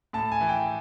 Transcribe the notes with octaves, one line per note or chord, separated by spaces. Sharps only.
A2 A5
G#5
E3
G5